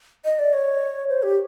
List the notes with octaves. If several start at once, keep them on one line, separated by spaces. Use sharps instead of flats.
D#5
D5
C#5
C5
G4